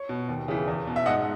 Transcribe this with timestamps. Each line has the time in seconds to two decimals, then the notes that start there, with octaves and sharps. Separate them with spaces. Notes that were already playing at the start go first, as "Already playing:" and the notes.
Already playing: C#5
0.09 B2
0.29 D#2
0.48 C#3 E3
0.67 E2
0.87 B2
0.96 E5
1.06 G#2 D#5 F#5